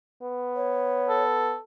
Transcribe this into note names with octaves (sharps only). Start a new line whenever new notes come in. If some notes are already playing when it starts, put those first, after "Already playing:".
B3
C#5
A4